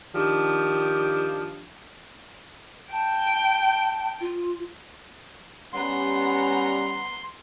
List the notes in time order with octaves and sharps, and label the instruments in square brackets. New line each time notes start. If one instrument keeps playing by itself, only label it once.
[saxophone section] D#3 F3 D4 G4
[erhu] G5 [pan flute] A5
[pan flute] F4
[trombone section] G3 C#4 [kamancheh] B3 A#5 [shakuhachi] F#5 [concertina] C6